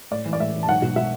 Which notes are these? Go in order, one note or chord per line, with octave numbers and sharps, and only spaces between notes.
A2 D5
E3
D5
A2 E5
E3
A5
B1 F#5
B2
B2 E5